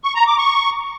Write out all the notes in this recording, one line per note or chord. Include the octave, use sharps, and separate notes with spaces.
C#6
A#5
D6
C#6